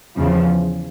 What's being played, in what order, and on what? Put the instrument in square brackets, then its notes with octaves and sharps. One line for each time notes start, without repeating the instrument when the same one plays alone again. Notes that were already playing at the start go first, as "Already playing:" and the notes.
[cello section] E2 C#3 F3